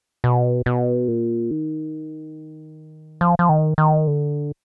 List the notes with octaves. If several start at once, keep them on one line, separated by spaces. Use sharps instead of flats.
B2
B2
A#2
D#3
F3
F3
D#3
D#3
D3